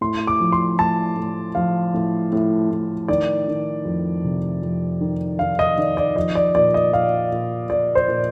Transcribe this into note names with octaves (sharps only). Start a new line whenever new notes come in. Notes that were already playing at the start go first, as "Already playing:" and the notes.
A2 C6
D6
F3
C6
A2 A5
A2
F3 F5
A2
A2
A2
D#3 D5
D#3
F2
C3
F2
D#3
D#3 F5
D#5
D#3 D5
D5
F3 D#5
D5
A#2 D5
D#5
A#2 F5
A#2
A#2 D5
C5
A#2